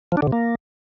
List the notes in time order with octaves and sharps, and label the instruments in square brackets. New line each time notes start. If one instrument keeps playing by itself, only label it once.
[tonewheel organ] F3
D4
D3
C3
A#3